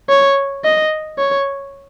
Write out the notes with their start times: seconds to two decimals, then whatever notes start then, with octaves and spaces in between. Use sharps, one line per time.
0.10 C#5
0.65 D#5
1.18 C#5